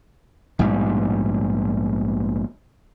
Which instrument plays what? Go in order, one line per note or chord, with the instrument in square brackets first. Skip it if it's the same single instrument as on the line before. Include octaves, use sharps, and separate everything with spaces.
[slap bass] A#1 G#2 B2 G3